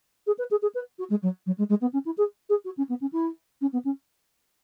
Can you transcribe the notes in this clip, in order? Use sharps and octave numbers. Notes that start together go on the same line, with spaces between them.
G#4
B4
G#4
G#4
B4
F#4
G#3
F#3
F#3
G#3
G#3
B3
C#4
E4
G#4
G#4
F#4
C#4
B3
C#4
E4
C#4
B3
C#4